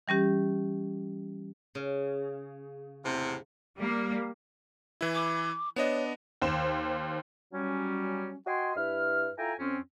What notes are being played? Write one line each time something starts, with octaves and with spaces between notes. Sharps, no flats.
E3 G3 C#4 G4
C#3
E2 A2 C3
G3 A#3
E3 E4
D6
B3 D4 C#5 D#5
D#2 C5 E7
F#3 G3 C#4
F#4 D#5 G5 G#5 C6
G2 E4 B4 F6
E4 F4 A4 G5 G#5 A#5
F2 C4 C#4